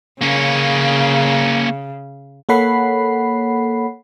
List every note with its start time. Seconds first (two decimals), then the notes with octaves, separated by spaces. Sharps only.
0.21 C#3 A#3 C#4
2.49 A#3 A4 C#5 F#5 B5 C7